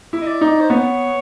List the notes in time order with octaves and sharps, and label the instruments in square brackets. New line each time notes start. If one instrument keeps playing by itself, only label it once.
[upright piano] E4
[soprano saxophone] D#5
D5
[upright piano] D#4
[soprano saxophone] C5
[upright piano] B3 [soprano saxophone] C#5